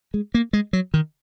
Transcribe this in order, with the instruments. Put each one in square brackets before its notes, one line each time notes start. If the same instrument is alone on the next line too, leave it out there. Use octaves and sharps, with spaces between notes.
[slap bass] G#3
A#3
G#3
F#3
D#3